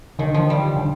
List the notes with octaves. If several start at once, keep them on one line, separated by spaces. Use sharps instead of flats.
D3 D#3
F3
G3
D3